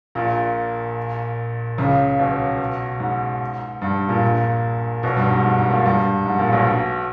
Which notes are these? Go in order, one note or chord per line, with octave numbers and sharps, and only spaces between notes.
A#1 A#2
C#2 C#3
B1 B2
G#2
G2
A#1 A#2
B1 B2
G2
G#2
G#2
G#2
A#1 A#2
G2
G#2
A#1 A#2
B1 B2